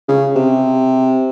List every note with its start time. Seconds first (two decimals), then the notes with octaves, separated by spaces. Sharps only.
0.09 C#3
0.36 C3